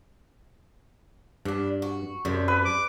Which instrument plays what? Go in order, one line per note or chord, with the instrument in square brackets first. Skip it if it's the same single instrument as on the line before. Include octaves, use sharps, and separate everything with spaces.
[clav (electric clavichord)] G2 [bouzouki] B3 D4
[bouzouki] F#4
[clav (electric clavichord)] F#2 [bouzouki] C3 G3 A3
[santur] B4
[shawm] D6